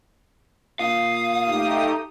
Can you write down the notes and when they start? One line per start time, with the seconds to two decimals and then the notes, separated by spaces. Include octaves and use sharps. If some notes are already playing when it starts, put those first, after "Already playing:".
0.79 A#2 F5 D#6
1.47 A3 D#4 G4